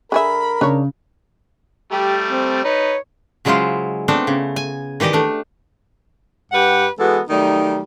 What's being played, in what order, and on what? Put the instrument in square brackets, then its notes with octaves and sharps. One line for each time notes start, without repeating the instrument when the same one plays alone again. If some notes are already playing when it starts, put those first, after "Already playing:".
[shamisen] D3 G#4 E5 [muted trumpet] A#4 [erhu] B5
[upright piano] C#3 [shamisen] D4 C#5
[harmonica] G3 A3 [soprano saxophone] G4
[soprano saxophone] C4
[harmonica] D#4 B4 [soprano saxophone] C#5
[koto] C#3 F#3 G#3 E4 F4 C5
A3 B3 C4 D4 A4
C#3
G#5
D#3 E3 G4 D5 D#5
A3 D4
[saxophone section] G2 G4 B4 F#5
E3 G#3 B3 F#4 A4
D#3 F#3 G3 A3 D#4